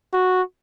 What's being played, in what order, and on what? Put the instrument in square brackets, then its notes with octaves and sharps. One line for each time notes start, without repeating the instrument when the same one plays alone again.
[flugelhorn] F#4